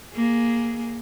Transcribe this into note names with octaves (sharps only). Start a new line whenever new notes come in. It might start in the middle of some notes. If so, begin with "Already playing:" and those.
A#3 G#4